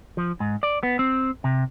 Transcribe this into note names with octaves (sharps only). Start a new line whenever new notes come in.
F3
G#2
D5
B3
C4
C3